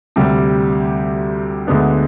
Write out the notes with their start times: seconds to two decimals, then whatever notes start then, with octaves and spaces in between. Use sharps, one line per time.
0.16 D2 C3 G3
1.67 D2 D3 G#3 B3 D4